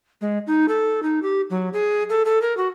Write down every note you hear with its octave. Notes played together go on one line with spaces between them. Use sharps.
G#3
D#4
A4
D#4
G4
F#3
G#4
A4
A4
A#4
F#4